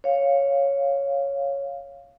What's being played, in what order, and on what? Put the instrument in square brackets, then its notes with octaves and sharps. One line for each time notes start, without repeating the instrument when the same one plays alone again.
[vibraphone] C#5 F5